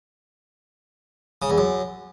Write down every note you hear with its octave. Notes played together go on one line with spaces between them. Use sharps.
C#3
E2
F#2